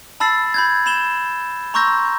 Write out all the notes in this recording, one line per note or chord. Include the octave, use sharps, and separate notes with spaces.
A5 B5 E6 A6 C7
B5 G6 G#6
B5 E7 G7
A#5 C6 C#6 E6 G6 A#6